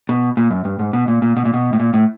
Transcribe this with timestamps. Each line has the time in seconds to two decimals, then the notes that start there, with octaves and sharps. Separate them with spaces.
0.09 B2
0.37 A#2
0.51 F#2
0.65 G2
0.79 G#2
0.93 B2
1.08 A#2
1.22 A#2
1.37 B2
1.45 A#2
1.54 B2
1.73 A2
1.80 A#2
1.94 A2